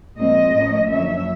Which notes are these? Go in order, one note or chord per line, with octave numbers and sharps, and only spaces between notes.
A#2 F3 G#3 C4 D#5
A2 F3 A#3 C#4
F#2 D3 F3 A#3 C#4 E5